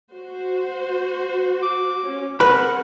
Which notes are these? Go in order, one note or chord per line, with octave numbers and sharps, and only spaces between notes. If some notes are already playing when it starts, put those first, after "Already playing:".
F#4 C5
D6
C#4
C4 G#4 A#4 B4 F#5 B5